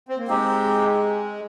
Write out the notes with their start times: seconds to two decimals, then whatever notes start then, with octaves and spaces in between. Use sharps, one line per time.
0.09 C4
0.18 A#3
0.28 G#3 C4 D#4 G4